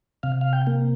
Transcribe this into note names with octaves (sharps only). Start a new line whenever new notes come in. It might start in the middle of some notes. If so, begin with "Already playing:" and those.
C3 F5
F5
G5
A#3